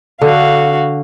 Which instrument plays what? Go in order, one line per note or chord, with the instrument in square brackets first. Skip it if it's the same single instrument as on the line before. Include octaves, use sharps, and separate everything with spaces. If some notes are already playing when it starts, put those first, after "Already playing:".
[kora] D3 [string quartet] F#4 F5